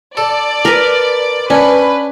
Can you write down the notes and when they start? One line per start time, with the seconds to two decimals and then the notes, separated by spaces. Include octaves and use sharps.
0.17 A4 D5
0.65 A#4 B4
1.50 C#4 D4 B4